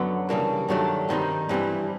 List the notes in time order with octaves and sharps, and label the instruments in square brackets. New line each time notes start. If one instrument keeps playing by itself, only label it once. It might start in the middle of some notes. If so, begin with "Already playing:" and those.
Already playing: [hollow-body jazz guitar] F#2 D3 F#3 B3
C#3 E3 G3 A#3 D4
G2 D#3 F#3 A3 D4
G2 D#3 G3 C4 D#4
G2 E3 G3 C4 E4